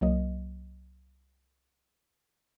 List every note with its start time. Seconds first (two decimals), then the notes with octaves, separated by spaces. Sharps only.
0.01 C2 F#3 A#3 D#5